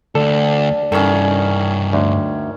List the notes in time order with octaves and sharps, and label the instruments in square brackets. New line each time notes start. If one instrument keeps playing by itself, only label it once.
[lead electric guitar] D2 [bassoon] D4 [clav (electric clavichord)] A4
[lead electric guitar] G2 E4 [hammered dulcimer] D#3 C#4 [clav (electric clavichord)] A4
[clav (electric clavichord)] D2